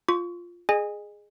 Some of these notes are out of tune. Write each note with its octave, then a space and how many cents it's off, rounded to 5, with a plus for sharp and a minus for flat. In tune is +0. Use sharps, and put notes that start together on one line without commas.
F4 +0 C#6 +30
G#4 +0 D#5 -30 G#5 -25